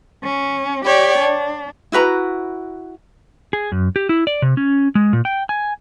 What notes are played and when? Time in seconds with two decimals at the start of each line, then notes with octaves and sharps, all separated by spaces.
0.22 C#4
0.85 G4 C#5 D5 G5
1.18 D4
1.92 E4 F#4 B4 A#5
3.53 G#4
3.72 F#2
3.96 G4
4.09 E4
4.27 D5
4.42 C3
4.57 C#4
4.95 G#3
5.13 A#2
5.25 G5
5.49 G#5